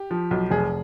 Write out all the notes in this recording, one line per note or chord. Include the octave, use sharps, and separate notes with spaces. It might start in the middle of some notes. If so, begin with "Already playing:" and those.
Already playing: G4
F3
B1
F1 G#4